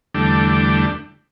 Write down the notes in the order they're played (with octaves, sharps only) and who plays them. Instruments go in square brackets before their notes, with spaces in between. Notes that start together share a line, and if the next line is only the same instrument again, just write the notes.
[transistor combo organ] E2 D3 G3 A3 D4